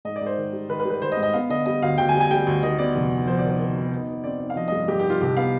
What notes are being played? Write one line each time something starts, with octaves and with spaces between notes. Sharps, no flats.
G#2 D#5
D5
G#2
C5
D#3
G3
D#3 B4
B4
G3
B4
D#3 C5
D#5
G#2
D#5
B3 F5
D3 D#5
G3 D#5
D2 F5
D2 G5
G#5
G3
G#5
G3 G5
D2
D#3 D#5
B3 D5
F1
B3
F2 C5
D5
D#3
D5
D#3
B3
D#4
D#4
C4 D5
D#4
F5
F3 D#5
G2 D#5
G2 G4
D#4 G4
F4
C2 G4
B3 F5